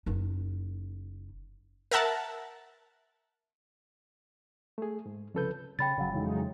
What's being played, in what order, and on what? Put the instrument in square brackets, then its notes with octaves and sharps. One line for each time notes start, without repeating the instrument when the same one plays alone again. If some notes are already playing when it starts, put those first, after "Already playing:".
[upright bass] F#1 D#4
[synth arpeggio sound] A#4 E5 F#5 A5
[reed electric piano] A3 G#4
G#2
C2 C#3 F3 A4 B4 G6
[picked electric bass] C#3 [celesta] G5 B5 A6
[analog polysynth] G1 [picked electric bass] C#3 F#3
[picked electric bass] F2 C#3 E3 [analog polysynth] F#3 G#3 D#4